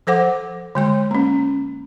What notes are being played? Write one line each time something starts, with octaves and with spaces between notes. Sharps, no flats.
F3 A4 C5 F#5 D6
D3 G#3 C6
A#3 C#4